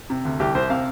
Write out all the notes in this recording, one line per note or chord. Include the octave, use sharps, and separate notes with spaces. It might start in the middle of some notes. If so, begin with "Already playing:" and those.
C3
D2
C2 G4
C2 C5
C3 F5